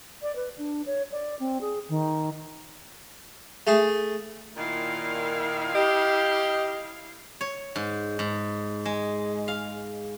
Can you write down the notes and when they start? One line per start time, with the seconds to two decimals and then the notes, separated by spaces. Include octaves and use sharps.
0.22 D5
0.36 B4
0.58 D4
0.86 C#5
1.12 D5
1.40 C4
1.61 G#4
1.89 D#3
3.67 A3 G#4
4.57 A#2 D#3 E4 F5
5.75 G4 D#5
7.41 C#5
7.76 G#2
8.19 G#2
8.85 G#3
9.48 F5